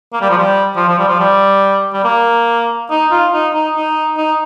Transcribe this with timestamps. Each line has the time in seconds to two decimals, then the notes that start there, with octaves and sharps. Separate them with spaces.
0.13 A#3
0.21 G3
0.30 F3
0.38 G3
0.76 F3
0.88 F3
0.99 G3
1.08 F3
1.19 G3
1.93 G3
2.04 A#3
2.91 D#4
3.11 F4
3.32 D#4
3.53 D#4
3.76 D#4
4.17 D#4